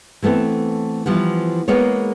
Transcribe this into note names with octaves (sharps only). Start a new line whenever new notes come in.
E3 A3 B3 C4 A4
E3 F3 G3 B3
G#3 A#3 B3 G#4 C#5